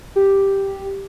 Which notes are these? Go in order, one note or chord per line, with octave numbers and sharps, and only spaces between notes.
G4